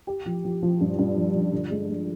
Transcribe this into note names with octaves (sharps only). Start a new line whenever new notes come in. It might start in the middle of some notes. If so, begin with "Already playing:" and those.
G4
F3
F3
F3
G2
G2
F3
F3
D3
G#3
G#3